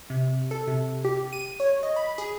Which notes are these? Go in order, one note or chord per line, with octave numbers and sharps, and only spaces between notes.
C3
A4
C3
G4
D#7
C#5
D#5
B5
G#4